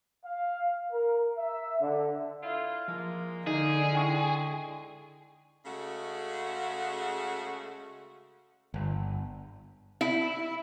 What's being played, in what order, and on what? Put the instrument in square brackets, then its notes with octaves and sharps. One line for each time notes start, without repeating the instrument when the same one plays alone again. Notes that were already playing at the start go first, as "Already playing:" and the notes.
[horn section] F5
A#4
E5
D3
E4 F4
[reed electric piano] F3 [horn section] G#3 A#3
[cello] D3 [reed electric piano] D#4 [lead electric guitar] G#4
[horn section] G#3 [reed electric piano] E4 G5 C#6
[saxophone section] C#3 G#3 A3 F#4
[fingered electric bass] G1
[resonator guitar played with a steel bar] E4